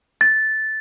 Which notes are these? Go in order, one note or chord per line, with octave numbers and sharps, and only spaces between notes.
A6